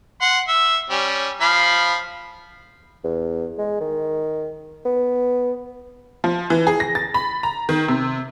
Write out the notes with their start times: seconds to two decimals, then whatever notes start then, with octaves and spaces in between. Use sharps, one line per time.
0.21 F#5 C6
0.48 E5
0.90 G3 C#4
1.41 F3 F5 B5
3.04 E2
3.58 G#3
3.80 D#3
4.85 B3
6.24 F3
6.50 E3
6.67 G#4
6.80 A#6
6.95 A6
7.14 B5
7.43 A#5
7.69 D#3
7.88 C3